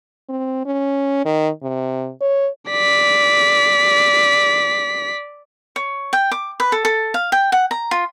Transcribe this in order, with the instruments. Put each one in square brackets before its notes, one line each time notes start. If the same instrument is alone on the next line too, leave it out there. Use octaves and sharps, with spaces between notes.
[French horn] C4
C#4
D#3
C3
C#5
[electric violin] D5 B6
[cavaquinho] C#5
G5
D6
B4
A4
A4
F5
G5
F#5
A#5
F4